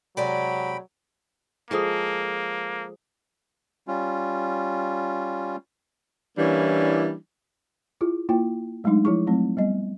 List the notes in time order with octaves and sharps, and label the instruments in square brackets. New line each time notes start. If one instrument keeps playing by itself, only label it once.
[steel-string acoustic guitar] C3 G#3 D5 [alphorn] F#3 [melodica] G5 B5
[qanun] F3 G#3 A4 [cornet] A#3 [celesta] G#4 D#6
[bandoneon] G3 C#4 F4
[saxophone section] E3 G3 A#3 C#4 D4 E4
[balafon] E4 F4 G#4
A#3 E4 F4 G5
F#3 G#3 A3 D4 D#4
F3 E4 G#4 C#6
F#3 A3 C4
G3 B3 D#5